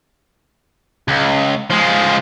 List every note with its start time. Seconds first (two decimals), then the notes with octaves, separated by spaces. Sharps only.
1.08 C#2
1.70 F3 G#3